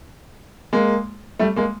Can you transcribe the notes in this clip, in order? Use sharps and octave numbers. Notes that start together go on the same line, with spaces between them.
G#3 A#3
G3 A3
G#3 A#3